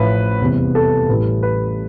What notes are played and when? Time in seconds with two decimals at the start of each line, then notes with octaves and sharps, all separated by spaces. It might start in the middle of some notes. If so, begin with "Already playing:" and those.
Already playing: A1 A2 F3 B4
0.41 F1 E2 C3 E3 G3
0.75 A4
1.08 A1 A2 E3 G3 B4
1.43 B4